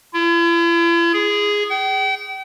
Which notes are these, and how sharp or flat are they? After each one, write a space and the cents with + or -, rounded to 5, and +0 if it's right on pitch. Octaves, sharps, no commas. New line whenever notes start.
E4 +45
G#4 -5
G5 -35